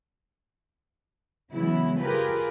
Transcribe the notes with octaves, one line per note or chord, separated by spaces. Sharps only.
C#3 E3 F#3 G#3 B3 E4
F4 G4 G#4 A#4 B4